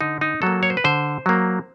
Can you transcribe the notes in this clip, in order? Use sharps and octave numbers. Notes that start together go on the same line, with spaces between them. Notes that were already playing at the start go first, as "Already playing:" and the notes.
D3 D#4
D#4
F#3 A#3 A4
C#5
C5
B4
D3 C5
F#3 A#3